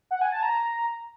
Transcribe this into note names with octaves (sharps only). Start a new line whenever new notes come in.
F#5
G#5
A5
A#5